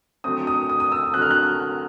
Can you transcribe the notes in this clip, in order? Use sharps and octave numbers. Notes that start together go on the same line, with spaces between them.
D3 F#3 A3 C4 D#6
D#6
D#6
D#6
E6
D3 F#3 A3 C4 F#6
F6
F#6